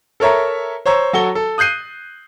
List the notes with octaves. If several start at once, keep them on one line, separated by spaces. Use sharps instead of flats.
A4 A#4 C#5 E5 A#5
C5 C#5 A#5 E6
F#3 F#4 A4 G7
A4
D#6 F#6 G6 C7 D#7